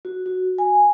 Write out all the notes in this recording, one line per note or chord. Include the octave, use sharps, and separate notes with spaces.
F#4
F#4
G#5